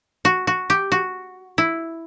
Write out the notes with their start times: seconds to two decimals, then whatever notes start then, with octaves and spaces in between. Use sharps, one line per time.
0.25 F#4
0.47 F#4
0.70 G4
0.92 F#4
1.58 E4